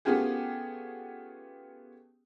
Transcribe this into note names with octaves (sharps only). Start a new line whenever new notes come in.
A3 B3 C#4 F4 G4 G#4